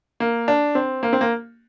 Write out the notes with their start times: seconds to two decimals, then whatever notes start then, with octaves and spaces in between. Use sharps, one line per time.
0.20 A#3
0.48 D4
0.75 C4
1.03 A#3
1.13 C4
1.21 A#3